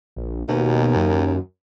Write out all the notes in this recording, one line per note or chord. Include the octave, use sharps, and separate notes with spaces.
A#1
D#2 B2
F#2